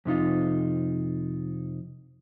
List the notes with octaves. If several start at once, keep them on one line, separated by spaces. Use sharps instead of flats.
F2 C3 D#4 F4